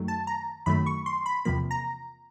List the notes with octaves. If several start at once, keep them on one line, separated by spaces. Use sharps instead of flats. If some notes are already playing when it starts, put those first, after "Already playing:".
Already playing: F#2 D#3 F#3 A3
A5
A#5
F#2 D#3 F#3 A3 B5
C#6
C6
B5
E2 C3 F3 A#3 B5
A#5